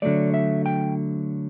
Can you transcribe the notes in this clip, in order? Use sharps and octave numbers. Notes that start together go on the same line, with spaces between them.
D3 F#3 A3 D5
E5
G5